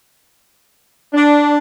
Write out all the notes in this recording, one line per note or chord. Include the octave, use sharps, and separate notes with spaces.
D4